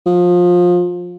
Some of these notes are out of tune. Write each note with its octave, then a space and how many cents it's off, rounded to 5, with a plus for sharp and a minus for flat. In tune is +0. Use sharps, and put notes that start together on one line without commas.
F3 +20